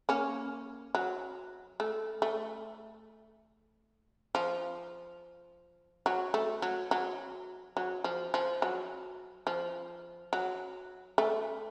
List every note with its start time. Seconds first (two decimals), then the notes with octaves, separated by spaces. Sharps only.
0.09 A#3 C#4
0.95 F#3
1.80 A3
2.22 A3
4.35 F3
6.06 F#3
6.34 A3
6.62 F#3
6.91 F#3
7.77 F#3
8.04 F3
8.34 F3
8.62 F#3
9.47 F3
10.33 F#3
11.18 A3